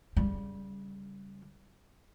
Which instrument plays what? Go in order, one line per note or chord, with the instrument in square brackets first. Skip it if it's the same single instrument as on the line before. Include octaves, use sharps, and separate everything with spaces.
[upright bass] C#3 G3